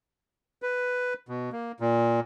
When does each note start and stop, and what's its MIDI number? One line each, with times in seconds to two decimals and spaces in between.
0.62 1.14 71
1.29 1.50 47
1.52 1.72 58
1.80 2.20 46